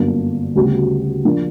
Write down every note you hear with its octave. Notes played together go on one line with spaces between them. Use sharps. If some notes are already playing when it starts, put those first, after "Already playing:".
Already playing: G1 F#2 D3 A#3
D2 C#3 G3 B3 F#4
A#1 A#2 A#3 D4